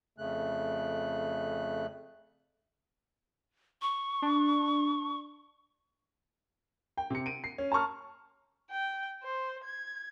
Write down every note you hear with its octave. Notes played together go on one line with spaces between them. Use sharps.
F2 C#3 A3 F#6
C#6
D4
G5
C3 C#7
D7 D#7
C7
C#4
A5 A#5 C#6 F6
G5
C5
G#6